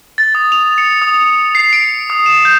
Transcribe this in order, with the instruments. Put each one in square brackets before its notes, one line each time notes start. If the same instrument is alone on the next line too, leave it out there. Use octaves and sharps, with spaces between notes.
[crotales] A6
D#6
F7
C#7
D#6
C7
D7
D#6
E7
G6